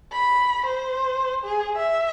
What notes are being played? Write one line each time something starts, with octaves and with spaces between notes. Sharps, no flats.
B5
C5
G#4
E5